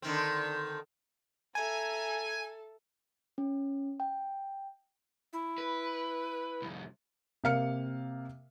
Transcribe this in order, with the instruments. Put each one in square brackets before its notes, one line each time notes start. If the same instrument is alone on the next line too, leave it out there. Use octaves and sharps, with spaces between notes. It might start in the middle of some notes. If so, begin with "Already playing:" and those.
[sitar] D3 D#3 C4
[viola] A4 [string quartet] E5 A#5 [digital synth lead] G#5
[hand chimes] C#4
G5
[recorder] E4
[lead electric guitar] B4
C2 F2
[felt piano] C3 A#3 F5 F6 C#7